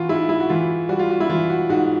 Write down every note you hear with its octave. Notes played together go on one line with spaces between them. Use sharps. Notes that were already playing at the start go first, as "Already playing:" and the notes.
Already playing: E3 F4 F#4
G#2 E4
E4
F#4
E3 F4
G3 F#4
F4
F#4
E4
E3 F4
F#4
G#2 F#4